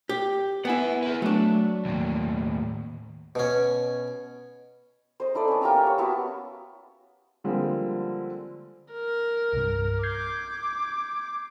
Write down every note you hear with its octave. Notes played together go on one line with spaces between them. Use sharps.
G4
B3 E4 F#5 G#5
G#4 B4
F#3 A3 D4
D#2 A2
B2 C#4
C5 D#5
D#4 E4 A4 D5
B3 C#4
A#3 G4 A#5 E6
C#5
B3 E4 F#4 A5
D3 F3 G3 G#3 A#3 C4
A#4
C2 G2
D6 G6 G#6 C7